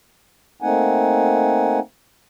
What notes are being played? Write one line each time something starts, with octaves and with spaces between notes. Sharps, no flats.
A3 A#3 C4 D#4 F#5 G#5